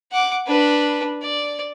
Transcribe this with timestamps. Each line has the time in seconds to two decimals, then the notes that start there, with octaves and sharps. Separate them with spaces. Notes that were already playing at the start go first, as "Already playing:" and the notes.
0.12 F#5 D6
0.47 D4 B4
1.22 D5